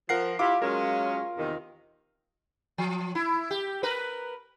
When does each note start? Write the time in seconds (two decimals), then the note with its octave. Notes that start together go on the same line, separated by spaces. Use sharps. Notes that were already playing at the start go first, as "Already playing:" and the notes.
0.09 F3 A#4 F#5 C7
0.39 E4 F4 G4 D6
0.62 F#3 G#3 C#4 A#4
1.37 E2 C3 D#3
2.78 F3
3.15 E4
3.51 G4
3.83 A#4 B4